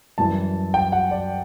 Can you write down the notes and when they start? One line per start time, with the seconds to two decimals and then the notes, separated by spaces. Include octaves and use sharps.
0.18 F#2 E3 G3 A5
0.74 G5
0.92 F#5
1.11 D5